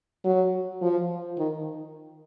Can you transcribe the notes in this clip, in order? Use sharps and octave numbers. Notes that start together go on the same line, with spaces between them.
F#3
F3
D#3